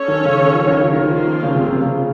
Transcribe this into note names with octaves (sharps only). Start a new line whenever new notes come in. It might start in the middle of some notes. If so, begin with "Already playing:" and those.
Already playing: C#4 A4 C#5
D#3
C#3
D#3
F3
D#3
C#3
D#3 F3 A#3 F4
C#3
C3
C3
C#3